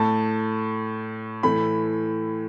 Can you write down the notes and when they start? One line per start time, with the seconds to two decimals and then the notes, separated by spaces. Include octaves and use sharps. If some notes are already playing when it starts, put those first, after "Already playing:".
Already playing: A2 A3 A5
1.43 A2 E3 A3 B5